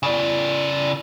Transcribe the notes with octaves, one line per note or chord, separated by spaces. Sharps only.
C#3 D5